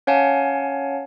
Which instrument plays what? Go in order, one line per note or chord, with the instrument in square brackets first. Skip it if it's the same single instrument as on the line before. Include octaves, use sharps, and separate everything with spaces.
[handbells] C#4 C#5 F5 F#5 G#5 A5